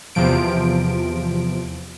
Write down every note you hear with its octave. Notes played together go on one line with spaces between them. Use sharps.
E2 C3 F3 D7